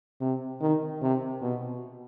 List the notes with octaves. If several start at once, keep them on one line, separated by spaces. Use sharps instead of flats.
C3
D#3
C3
B2